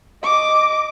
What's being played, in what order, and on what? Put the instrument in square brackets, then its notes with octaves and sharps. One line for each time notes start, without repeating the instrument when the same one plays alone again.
[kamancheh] D#5 D6